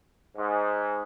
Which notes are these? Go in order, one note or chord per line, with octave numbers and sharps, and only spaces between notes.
G#2